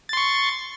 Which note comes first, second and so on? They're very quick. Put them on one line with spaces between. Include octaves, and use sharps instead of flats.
A6 C6 C#6